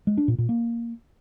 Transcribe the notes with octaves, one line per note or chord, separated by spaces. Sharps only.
G#3
D4
A#2
A#2
A#3